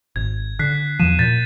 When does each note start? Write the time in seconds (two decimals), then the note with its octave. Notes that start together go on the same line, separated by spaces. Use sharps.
0.16 G#1 G#6
0.59 D3 F#6 B6 C7
0.99 E2 F3 D#7 E7
1.19 A#2 G6 A6 B6